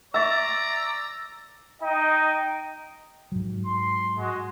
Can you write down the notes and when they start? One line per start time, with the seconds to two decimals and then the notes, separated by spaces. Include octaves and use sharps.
0.14 D5 E5 A#5 C#6 E6 A6
1.82 D#4 D#5 G5
3.32 G#2 F#3
3.64 C6
4.17 G#3 F#4